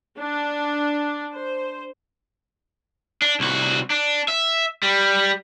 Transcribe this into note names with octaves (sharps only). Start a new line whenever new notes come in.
D4
C5
D4
C2 F#4
D4
E5
G3